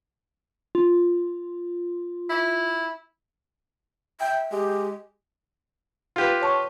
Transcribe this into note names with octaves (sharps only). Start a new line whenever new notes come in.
F4
E4
E5 G5
G#3 G4
F4 G4 B4
C#5 A5 C#6